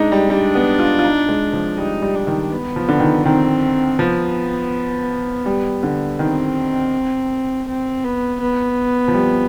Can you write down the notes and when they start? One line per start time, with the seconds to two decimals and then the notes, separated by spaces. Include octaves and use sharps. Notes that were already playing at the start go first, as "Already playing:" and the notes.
Already playing: G#3 D4 D#4
0.12 G3
0.30 G3 D4
0.55 B3
0.79 F4
0.99 F4
1.04 D#4
1.29 G#3
1.53 F3
1.78 G3 D#4
2.02 G3
2.14 D4
2.27 D#3
2.51 B3
2.76 F3
2.89 D3
3.00 D#3
3.25 D#3 C4
3.99 F3 B3
5.46 G3
5.83 D3
6.19 D#3 C4
7.67 C4
8.04 B3
8.41 B3
9.08 F3
9.14 G3